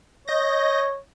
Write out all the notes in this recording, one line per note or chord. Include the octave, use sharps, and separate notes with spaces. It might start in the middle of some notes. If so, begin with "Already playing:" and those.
C#5 D#5 G6 A#6